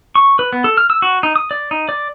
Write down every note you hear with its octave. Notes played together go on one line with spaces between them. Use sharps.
C#6
B4
B3
A4
F6
E6
F#4
D#4
D#6
D5
D#4
D5